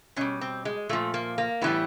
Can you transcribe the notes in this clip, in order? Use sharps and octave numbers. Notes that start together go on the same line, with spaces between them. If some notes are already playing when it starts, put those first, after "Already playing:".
B2 G3 C#4
C4
G#3
A#2 F3 A3
A#3
A#3
A2 E3 G3 B3